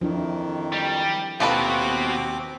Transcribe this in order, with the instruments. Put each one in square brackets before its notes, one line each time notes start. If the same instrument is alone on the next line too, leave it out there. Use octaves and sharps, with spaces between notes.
[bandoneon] F2 D#3 [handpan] F3 D4 E4
[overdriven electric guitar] G3
[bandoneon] D#2 C4 D6 [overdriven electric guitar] B2 F#4 [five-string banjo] F4 A4 B4